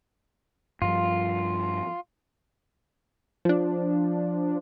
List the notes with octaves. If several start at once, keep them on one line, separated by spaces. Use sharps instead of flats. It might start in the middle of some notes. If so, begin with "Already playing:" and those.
G2 F3 G3 F4
F3 D4